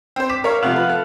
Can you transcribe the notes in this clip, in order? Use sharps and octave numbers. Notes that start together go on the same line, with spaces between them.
C4 C5
D6 B6 E7
A#4 C#5 F5
C3 F3 A3 F5 F#5
F3 B4
A4